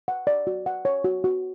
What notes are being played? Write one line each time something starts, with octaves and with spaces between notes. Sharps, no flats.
F#5
D5
F#4
F#5
C#5
F#4
F#4